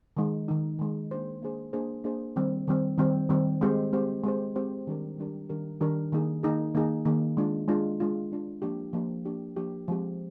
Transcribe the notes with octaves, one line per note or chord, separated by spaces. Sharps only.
D#3 G#3 D#4
D#3 G#3 D#4
D#3 G#3 D#4
A#3 D4 G#4 C5
A#3 D4 G#4 C5
A#3 D4 G#4 C5
A#3 D4 G#4 C5
D#3 G3 C4
D#3 G3 C4
D#3 G3 C4
D#3 G3 C4
G#3 C4 G4 C5
G#3 C4 G4 C5
G#3 C4 G4 C5
G#3 C4 G4 C5
D#3 G3 D4 G4 A#4
D#3 G3 D4 G4 A#4
D#3 G3 D4 G4 A#4
D#3 G3 D4 G4 A#4
D#3 A#3 D#4 G#4
D#3 A#3 D#4 G#4
D#3 A#3 D#4 G#4
D#3 A#3 D#4 G#4
G#3 D4 F4
G#3 D4 F4
G#3 D4 F4
G#3 D4 F4
F3 A#3 D4 G4
F3 A#3 D4 G4
F3 A#3 D4 G4
F3 A#3 D4 G4
F3 G#3 C4 G4